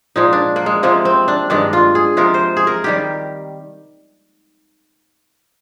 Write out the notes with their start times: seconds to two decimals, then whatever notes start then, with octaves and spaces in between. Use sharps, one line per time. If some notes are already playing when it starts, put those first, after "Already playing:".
0.16 A#2 F3 G#3 D#4
0.33 D4
0.56 A#3
0.66 G#3
0.83 C3 F3 G#3 A#3
1.05 C4
1.28 D4
1.50 G2 D#3 G#3 D4
1.73 F4
1.95 G#4
2.17 C3 F3 G#3 A#4
2.34 C5
2.57 G#4
2.67 A#4
2.84 D#3 G3 G4